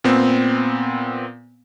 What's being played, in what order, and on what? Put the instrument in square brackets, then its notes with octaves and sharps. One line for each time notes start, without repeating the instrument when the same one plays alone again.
[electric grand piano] A#2 B3 C4